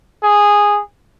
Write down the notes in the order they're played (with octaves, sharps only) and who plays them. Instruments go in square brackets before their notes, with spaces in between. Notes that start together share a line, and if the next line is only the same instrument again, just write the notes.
[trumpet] G#4